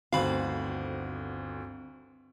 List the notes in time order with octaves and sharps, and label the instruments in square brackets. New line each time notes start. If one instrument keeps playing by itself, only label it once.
[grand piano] G1 D2 D#3 [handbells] C4 [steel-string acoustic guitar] F#4 C5 [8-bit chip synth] F5 B5